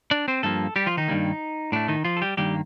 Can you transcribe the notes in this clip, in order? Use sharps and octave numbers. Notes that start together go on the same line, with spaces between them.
D4 D5
C4 C5
G2 F3 A3 A#3 A4
G3 G4
F3 F4
D#3 D#4
G2 D#3 G3 A#3
A2 A3 D4
D#3 D#4
F3 F4
A4
G3 G4
G2 D#3 G3 A#3 G4